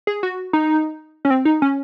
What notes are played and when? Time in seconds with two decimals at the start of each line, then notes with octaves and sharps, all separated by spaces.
0.07 G#4
0.23 F#4
0.53 D#4
1.25 C#4
1.30 C4
1.45 D#4
1.62 C#4